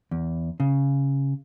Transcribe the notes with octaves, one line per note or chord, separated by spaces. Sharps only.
E2
C#3